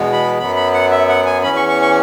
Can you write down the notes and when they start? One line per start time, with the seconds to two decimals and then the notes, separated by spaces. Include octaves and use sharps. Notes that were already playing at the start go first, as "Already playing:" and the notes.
Already playing: E2 B2 G#3 B3
0.13 B5
0.39 F#2 F#3 B3 B5
0.56 B5
0.74 F#5
0.91 E5
1.08 F#5
1.26 G#5
1.43 E2 E3 C#4 B5
1.56 C#6
1.69 C#6
1.82 C#6